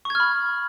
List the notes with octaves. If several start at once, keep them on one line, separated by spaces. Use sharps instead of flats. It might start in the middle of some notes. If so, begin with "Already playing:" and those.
B5 C#6 F6 G#6